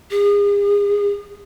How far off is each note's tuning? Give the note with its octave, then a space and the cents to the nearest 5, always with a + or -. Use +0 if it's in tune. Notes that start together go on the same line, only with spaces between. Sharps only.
G#4 -35